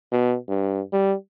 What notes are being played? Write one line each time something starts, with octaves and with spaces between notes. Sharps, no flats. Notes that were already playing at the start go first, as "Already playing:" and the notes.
B2
G2
G3